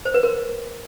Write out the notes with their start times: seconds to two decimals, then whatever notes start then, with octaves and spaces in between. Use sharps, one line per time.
0.05 C5
0.14 B4
0.23 A#4